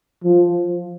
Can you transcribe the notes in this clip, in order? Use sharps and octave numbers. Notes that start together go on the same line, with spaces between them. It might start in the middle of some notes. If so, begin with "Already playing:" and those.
F3